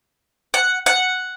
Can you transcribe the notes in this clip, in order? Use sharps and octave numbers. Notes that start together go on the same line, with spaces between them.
F#5
F#5